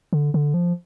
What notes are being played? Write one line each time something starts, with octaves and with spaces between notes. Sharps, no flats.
D3
D3
F3